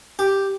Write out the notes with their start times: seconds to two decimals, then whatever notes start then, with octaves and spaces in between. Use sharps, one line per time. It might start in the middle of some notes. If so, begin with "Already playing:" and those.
0.19 G4